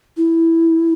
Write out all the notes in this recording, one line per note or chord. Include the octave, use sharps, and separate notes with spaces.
E4